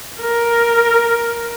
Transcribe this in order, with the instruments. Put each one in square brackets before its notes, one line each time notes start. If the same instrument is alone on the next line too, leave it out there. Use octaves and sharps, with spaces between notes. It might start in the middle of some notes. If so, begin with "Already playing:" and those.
[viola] A#4